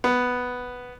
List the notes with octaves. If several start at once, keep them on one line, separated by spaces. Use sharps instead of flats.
B3